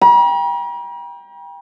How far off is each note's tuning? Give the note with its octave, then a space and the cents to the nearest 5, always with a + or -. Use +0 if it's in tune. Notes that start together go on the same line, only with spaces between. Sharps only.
G5 +25 A#5 +45